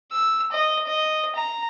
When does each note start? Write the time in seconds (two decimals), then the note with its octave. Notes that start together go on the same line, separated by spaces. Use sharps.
0.12 E6
0.52 D#5
0.87 D#5
1.35 A#5